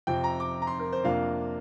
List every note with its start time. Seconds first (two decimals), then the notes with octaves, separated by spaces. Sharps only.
0.07 F2 C3 F3 C4 G5
0.24 A#5
0.40 D6
0.62 A#5
0.67 C6
0.80 A#4
0.93 C5
1.04 F2 C3 A#3 D4 F4 F5